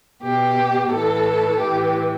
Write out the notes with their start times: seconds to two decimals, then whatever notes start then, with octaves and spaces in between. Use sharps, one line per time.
0.22 B2 G4
0.90 A2 E3 A4
1.59 A2 E3 G4